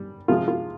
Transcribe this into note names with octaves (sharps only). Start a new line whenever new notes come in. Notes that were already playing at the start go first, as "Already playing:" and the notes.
Already playing: G3
C3 F3 G#3 F4
F4